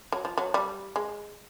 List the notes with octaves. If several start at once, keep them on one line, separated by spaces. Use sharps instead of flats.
F#3
F3
F#3
G3
G#3